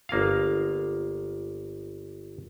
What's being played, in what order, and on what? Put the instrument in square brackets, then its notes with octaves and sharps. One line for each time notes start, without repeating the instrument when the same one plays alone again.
[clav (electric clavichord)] G1 A#3 F4 F5